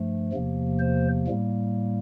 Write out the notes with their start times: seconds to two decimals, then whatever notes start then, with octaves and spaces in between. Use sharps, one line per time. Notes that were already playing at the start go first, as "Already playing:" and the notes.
Already playing: G2 F3 A3
0.32 E2 C3 F3 A#3
0.79 C5
1.28 A2 G3 A#3